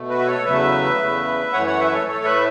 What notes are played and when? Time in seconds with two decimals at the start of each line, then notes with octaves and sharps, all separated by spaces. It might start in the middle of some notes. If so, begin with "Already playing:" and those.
Already playing: B2 A3
0.09 F#4 B4
0.19 E5
0.27 A4 C#5
0.45 E2 C#3 F#3 A3 B4 E5
0.99 E2 C#3 A3
1.53 F#2 E3 A3 C#5 F#5
1.66 C#5 F#5
1.80 B4 E5
1.93 A4 C#5
2.07 A2 A3 A4 C#5
2.24 B4 E5